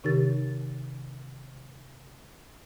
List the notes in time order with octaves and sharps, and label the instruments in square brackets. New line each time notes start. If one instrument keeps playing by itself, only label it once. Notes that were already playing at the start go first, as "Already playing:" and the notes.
[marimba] C3 D#3 D#4 G4 A#4 A6